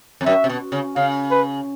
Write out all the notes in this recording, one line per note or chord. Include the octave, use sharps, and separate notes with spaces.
F2
F#2 E5
C3
B2
C#3
C#3 F5
B4